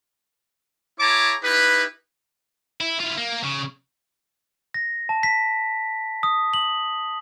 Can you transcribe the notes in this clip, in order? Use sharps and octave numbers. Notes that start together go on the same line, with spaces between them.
E4 G#4 C#5 A5 A#5 D6
D#4 E4 G4 B4
E4
E4 F4
A#3
C#3
A#6
A5
B6
D#6
F#7